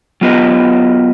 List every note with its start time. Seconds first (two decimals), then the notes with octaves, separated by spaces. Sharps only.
0.21 F#3 B3 F4 B4 D#5